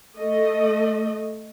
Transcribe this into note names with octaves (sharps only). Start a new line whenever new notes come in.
A3 D#5